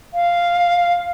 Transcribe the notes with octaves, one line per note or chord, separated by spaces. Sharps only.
F5